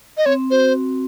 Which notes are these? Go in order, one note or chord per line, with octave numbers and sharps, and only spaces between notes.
D#5
C4 C#5
F#4 C5